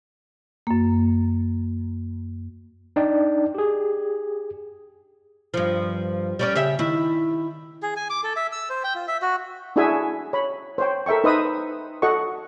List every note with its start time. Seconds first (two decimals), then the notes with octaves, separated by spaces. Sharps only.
0.67 F#2 A#3
2.96 D4 D#4 D5 G5
3.55 G4 G#4
5.54 G2 F3
6.39 G3 C#4 D5
6.55 C#3 G4 E5
6.79 D#3 E4
7.83 G#4
7.96 G#5
8.10 D6
8.23 A4
8.36 E5
8.52 E6
8.70 C5
8.84 G5
8.95 F4
9.08 E5
9.22 F#4
9.76 D4 E4 F#4 G#4 E5 G#5
10.33 C#5 B5
10.78 C5 C#5 G5
11.06 A4 A#4 E5 G5 C#6
11.24 D#4 B4 C5 D#5 E5 D#6
12.02 F#4 A4 D#5 F#5 C#6